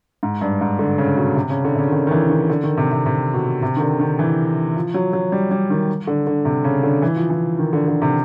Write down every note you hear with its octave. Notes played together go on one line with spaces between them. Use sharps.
G#2
G2
G#2
D3
C#3
B2
C3
C#3
D3
C3
C#3
D#3
D3
D#3
E3
D#3
D3
D#3
C3
C3
C3
B2
C3
D#3
D3
D#3
E3
F3
F#3
F#3
G3
G3
D#3
D3
D3
C3
C#3
D3
E3
F3
E3
D#3
D3
D3
C3